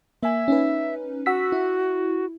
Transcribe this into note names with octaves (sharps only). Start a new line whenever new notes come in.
A#3 E5 G#5
C#4 D#4 B4
F#4 F#5 E6 B6
E4